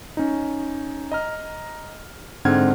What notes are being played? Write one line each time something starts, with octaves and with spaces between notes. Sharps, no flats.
C#4 D#4
D#5 A#5 F6
G#2 D3 C4 F#5 F6 G#6